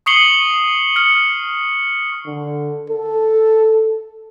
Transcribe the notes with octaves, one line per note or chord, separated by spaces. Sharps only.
C#6 D#6 C7 C#7 F#7 G7
F6 C#7
D3
A4